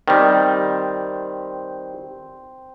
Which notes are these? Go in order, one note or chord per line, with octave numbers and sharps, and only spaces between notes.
D#3 G3 C4